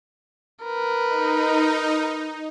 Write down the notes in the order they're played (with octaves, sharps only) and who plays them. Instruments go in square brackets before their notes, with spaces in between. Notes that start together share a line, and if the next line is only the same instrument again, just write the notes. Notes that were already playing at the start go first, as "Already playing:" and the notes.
[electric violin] A#4 B4
[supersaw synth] D#4